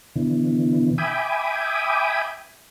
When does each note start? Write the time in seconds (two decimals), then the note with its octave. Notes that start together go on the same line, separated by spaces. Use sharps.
0.16 B2 D3 E3
0.98 E5 G5 G#5 B5 D6 D#6